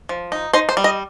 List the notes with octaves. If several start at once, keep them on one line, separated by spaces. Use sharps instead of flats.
F3
D#4
D#4 C5
C5
G3
D#5